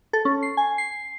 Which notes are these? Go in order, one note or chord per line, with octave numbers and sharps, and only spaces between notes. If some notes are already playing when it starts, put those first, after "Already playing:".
A4
C#4
C7
G#5
C7